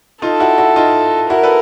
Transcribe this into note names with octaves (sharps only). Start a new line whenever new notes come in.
D#4 F4 A4
E4 F#4
E4 F#4
D#4 F4
E4 F#4 A#4
A4 B4